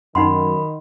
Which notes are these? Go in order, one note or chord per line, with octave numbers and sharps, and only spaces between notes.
F#2 D#3 D#4 F#5 B5 C6